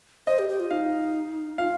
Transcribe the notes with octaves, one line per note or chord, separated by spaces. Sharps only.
C5 D#5
G4
G4
F4
D#4 F5
F4 F5